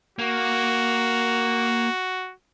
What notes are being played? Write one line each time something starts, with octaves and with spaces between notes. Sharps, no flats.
A#3 F#4